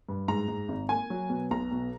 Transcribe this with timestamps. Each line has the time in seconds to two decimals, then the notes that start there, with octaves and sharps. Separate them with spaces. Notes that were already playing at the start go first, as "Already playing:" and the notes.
0.09 G2
0.28 G#2 A#5
0.48 G#2
0.68 G#1
0.89 A#3 G#5
1.10 F#3
1.30 B2
1.51 B1 A#5
1.71 B2